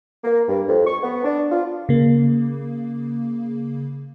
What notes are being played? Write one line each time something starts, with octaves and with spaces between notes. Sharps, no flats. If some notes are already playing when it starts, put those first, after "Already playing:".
A#3
G2
F2
C#6
B3
D4
F4
C#3 A#3